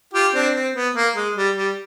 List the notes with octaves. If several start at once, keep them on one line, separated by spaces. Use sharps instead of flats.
F4 G4
C4 D4
C4
B3
A#3
G#3
G3
G3